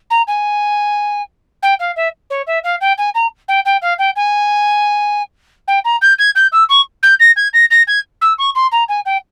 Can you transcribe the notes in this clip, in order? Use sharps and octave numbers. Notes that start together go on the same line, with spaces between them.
A#5
G#5
G5
F5
E5
C#5
E5
F5
G5
G#5
A#5
G5
G5
F5
G5
G#5
G5
A#5
G6
G#6
G6
E6
C#6
G6
A#6
G#6
A#6
A#6
G#6
E6
C#6
C6
A#5
G#5
G5